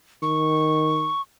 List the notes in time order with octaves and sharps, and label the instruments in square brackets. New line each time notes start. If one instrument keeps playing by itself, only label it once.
[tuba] D#3 [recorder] C#6